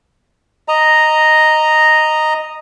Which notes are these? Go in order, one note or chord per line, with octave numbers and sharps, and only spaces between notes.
D#5 A#5